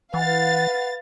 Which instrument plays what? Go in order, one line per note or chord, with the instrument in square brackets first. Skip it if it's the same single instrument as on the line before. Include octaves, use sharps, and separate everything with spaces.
[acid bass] E3 [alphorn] B4 [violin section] F5 A6 [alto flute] F#5